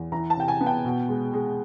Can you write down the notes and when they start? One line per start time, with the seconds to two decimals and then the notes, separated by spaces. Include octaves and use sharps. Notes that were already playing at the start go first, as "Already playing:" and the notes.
Already playing: E2
0.12 E3 A#5
0.30 A5
0.36 C3 G5
0.48 G#5
0.61 B3
0.67 G5
0.85 B2
1.09 G#3
1.33 G#3